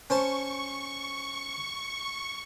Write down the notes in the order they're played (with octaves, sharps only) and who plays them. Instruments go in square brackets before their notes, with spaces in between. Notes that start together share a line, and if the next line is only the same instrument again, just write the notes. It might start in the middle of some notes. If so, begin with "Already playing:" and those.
[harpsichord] C#4 C5 A5 [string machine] C#6